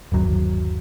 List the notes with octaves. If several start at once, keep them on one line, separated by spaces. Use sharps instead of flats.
G1 D#2 F#3